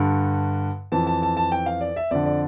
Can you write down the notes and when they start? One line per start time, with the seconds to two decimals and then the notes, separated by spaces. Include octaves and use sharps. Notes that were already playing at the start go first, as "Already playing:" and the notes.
Already playing: G2 D3
0.92 F2 E3 A5
1.07 A5
1.23 A5
1.37 A5
1.52 G5
1.66 F5
1.81 D5
1.96 E5
2.11 F2 D3 D5
2.26 D5